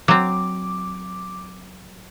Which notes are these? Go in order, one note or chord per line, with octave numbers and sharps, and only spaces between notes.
F#3 C4 D6